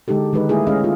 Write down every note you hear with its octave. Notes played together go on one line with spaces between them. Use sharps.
D3 G#3 D#4 G4 A4
D#3 G#3 D#4 B4
A3 A#3 E4 G#4
G#3 C#4 D#5 F5
A3 F4